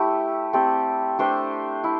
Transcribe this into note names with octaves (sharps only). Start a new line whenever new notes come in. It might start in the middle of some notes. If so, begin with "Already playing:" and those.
Already playing: A3 E4 G4
A3 C4 G4 D5
A3 D4 G4 C5
E4